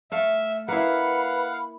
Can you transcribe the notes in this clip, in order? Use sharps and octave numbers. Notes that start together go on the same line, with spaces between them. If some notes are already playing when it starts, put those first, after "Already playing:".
A3 E5 F5
A#3 E4 B4 F5 F#5 B5